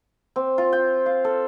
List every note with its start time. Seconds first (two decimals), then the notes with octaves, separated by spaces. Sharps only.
0.36 C4
0.58 F4
0.73 G5
1.06 F5
1.25 A4